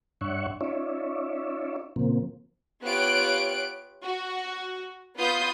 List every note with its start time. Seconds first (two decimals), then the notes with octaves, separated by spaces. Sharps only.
0.21 G2 D4 C#5 E5 F#5 C#6
0.61 C#4 D#4 F4 C#5 D5 E5
1.96 A#2 C#3 F3 A#3 C4
2.82 B3 F4 G4 C#5 F#6 D7
4.03 F#4
5.17 B3 F4 B4 D#6 G6 C7